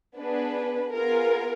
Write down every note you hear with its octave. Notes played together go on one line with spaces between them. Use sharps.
B3 D4 G#4 B4
B3 F4 G#4 A#4